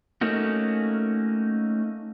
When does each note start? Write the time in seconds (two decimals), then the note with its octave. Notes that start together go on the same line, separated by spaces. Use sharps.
0.21 A3 A#3 C#4 D#4 F#4